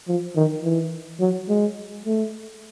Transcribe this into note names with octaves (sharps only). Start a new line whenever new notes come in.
F3
D#3
E3
F#3
G#3
A3